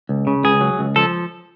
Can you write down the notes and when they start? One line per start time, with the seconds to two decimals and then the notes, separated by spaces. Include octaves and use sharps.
0.09 C#2
0.27 C#3
0.44 C#2 G#4
0.61 F#3
0.79 C#2
0.96 F3 A4